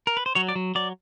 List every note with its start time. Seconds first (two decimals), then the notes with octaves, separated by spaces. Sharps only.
0.07 A#4
0.17 B4
0.26 C5
0.35 F#3 C#5
0.49 D5
0.55 F#3
0.75 F#3 D5